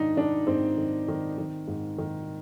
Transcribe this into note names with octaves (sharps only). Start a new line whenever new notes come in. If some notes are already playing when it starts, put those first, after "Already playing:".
Already playing: G#2 D#3 D4 D#4
D#3 D4
G#2 C4
D#3
D#3
D#3
G#2
D#3